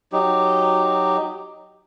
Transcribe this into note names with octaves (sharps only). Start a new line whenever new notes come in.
F#3 D#4 G4